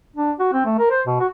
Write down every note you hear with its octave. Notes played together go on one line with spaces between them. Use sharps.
D4
F#4
C4
A3
A#4
C5
B2
F#4